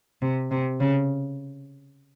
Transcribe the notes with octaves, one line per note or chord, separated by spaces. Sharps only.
C3
C3
C#3